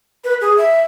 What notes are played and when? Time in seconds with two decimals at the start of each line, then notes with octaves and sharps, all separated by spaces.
0.24 B4
0.41 G#4
0.58 E5